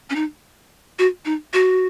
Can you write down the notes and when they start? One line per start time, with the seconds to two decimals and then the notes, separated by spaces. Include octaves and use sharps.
0.10 C#4
0.16 D#4
0.99 F#4
1.25 D#4
1.54 F#4